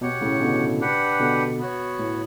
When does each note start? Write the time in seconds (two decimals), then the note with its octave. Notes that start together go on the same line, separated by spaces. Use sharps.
0.01 B2 G4 C#5 F#5
0.21 A2 C#3
0.41 B2 D3
0.81 D4 G4 B4 F#5
1.20 B2 D3
1.58 B3 F#4 C#5
1.99 A2